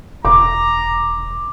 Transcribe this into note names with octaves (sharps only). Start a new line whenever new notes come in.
E1 A#5 D6